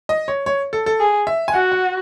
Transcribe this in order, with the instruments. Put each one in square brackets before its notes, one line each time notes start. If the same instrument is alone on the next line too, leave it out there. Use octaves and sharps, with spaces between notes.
[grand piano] D#5
C#5
C#5
A4
A4
[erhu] G#4
[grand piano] E5
G#5
[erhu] F#4 [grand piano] F#5
[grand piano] F#5